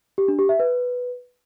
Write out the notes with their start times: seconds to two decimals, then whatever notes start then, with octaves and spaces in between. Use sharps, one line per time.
0.18 G4
0.28 D4
0.39 G4
0.49 E5
0.59 B4